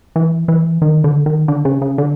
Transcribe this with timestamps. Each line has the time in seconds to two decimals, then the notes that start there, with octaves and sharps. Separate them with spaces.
0.16 E3
0.48 E3
0.82 D#3
1.04 D3
1.26 D#3
1.48 D3
1.65 C#3
1.82 C#3
1.98 D3